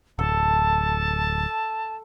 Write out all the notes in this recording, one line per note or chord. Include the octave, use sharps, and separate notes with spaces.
D1 A4 A5